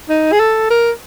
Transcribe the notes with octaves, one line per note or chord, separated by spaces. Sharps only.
D#4
G#4
A4
A#4